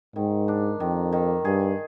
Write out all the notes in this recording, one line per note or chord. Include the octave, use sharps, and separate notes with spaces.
G#2 D#3
D4
F2 D#3
D#3
G2 G#4